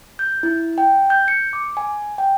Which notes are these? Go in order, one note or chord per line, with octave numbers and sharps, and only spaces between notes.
G6
E4
G5
G6
C#7
D6
G#5
G5